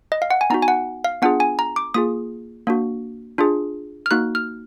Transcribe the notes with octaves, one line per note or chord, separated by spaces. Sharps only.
D#5
F5
F#5
G#5
B3 D#4 F#4 A#5
G#5
F#5
F5
B3 D4 F4 G#4 F#5
G#5
A#5
D6
A#3 F4 G#4 D#6
A#3 D4 F#4
D4 F4 G#4
F6
A#3 D#4 F#4 F#6
F6